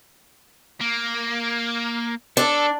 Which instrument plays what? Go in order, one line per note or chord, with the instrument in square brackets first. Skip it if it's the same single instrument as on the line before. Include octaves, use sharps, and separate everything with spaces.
[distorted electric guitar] A#3
[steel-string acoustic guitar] D4 [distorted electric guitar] A4